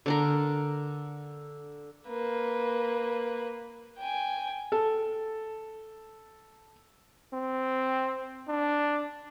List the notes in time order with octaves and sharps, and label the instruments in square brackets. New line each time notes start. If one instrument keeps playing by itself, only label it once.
[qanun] D3 D4 A#4
[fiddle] A#3 B4
G5 G#5
[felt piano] A4 A5
[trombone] C4
D4